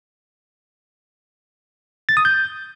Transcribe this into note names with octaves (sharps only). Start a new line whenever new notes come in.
A6
D#6
G6